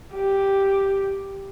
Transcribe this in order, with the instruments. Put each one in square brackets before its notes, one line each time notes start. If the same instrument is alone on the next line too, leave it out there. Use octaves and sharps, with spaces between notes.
[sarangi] G4